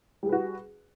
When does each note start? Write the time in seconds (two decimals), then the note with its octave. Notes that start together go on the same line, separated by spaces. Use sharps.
0.23 G3
0.26 G#4
0.29 B4
0.32 F#4